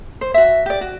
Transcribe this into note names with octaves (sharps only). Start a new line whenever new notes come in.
C5
F#4 E5
G4 D5
F#4